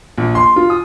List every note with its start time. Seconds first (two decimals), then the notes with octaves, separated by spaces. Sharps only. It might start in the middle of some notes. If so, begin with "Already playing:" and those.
0.18 A#1
0.35 C6
0.56 F4
0.70 D#6